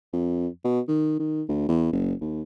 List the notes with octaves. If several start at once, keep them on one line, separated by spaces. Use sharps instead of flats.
F2
B2
D#3
D#3
D2
E2
F#1
D#2